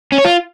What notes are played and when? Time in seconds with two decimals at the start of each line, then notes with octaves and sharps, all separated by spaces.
0.12 C#4
0.18 C#5
0.25 F4